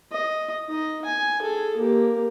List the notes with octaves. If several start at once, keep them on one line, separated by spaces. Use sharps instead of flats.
D#5
D#4 D#5
G#5
G#4 A4
A#3 G4